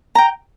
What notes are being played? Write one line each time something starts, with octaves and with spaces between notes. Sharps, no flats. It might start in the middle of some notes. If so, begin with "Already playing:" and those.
G5 A#5